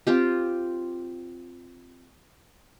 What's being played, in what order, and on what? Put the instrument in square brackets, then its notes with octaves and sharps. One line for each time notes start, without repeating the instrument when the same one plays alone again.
[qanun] C4 F4 G4